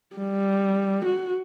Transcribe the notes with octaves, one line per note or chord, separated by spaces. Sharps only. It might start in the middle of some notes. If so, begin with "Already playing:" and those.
G3
F#4